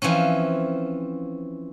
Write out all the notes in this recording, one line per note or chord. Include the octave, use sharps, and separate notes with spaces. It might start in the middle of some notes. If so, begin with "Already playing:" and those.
E3 F3 C4 C#4